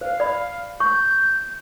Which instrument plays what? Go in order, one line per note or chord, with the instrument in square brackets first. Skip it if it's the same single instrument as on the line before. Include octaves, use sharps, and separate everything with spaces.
[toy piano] C5 [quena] F5
[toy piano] D5 B5
[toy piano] C#6 [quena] G6